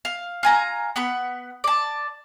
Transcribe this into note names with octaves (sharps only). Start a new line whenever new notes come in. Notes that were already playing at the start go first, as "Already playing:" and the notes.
F5
F4 G#5 A#5
B3 F#5 B5
D5 A5